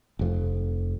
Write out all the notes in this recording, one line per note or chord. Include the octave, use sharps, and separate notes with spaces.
F1 F2